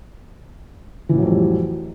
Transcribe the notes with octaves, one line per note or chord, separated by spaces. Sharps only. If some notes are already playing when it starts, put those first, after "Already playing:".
F2 A2 E3 F#3 G3